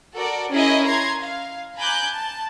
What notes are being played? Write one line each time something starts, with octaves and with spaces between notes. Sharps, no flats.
F#4 A4 A#4 D5
C#4 E4 G#4 A#4 D#5
A#5 C6 G#6
F5
G#5 A#5 B5 D6 F#6 G6
A5